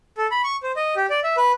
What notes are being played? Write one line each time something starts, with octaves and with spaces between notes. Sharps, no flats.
A4
B5
C#6
C5
D#5
G4
D5
E5
B4